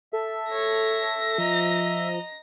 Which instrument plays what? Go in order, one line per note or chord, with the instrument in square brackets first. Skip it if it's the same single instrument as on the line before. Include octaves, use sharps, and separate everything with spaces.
[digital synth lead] A4 [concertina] E5
[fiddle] C#5 [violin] A#6
[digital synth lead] F3 [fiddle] D#5 A#5